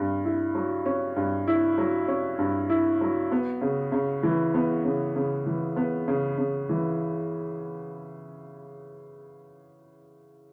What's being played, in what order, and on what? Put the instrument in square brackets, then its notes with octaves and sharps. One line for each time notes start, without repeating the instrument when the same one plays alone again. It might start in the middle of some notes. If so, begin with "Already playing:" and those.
Already playing: [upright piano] G2
E4
F#3
C#4
G2
E4
F#3
C#4
G2
E4
F#3
B3
C#3
C#3
E3
B3
C#3
C#3
E3
B3
C#3
C#3
E3